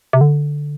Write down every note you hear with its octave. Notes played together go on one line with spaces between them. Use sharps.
C3
D3